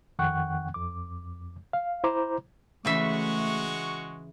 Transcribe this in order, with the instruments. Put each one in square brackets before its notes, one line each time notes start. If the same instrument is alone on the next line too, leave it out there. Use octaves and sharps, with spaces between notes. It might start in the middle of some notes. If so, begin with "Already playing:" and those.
[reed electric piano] F2 D#3 F#5 G5 C#6 F#6
F2 D6
F5
E4 C5 A#5 D6
[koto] C#3 E3 E5 [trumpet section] G#3 F#4 C#6 [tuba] A3